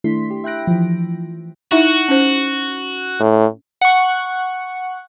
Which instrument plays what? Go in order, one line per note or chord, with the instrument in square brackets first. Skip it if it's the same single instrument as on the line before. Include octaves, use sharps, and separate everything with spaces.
[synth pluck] D#3 A3 D4 E4 C6 B6
G4
E5 G5 B5 F#6 A#6 D7
E3 F3
[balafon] D#4 E4 E5 [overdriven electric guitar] F#4
[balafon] C#4 C5
[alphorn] A2
[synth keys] F#5 C#6